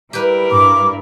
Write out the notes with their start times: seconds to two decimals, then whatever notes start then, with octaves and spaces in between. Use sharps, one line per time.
0.13 G3 E4 G4 A#4 B4
0.51 G2 D6